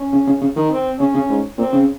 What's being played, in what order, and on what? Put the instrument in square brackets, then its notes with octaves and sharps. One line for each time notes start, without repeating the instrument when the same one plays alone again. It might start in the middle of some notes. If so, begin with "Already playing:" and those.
Already playing: [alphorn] C#4
[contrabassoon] C#3
C#3
C#3
D#3
[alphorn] C4
[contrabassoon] C#3 [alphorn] C#4
[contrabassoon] C#3
G#2
[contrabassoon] A#2 [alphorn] C4
[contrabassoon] C#3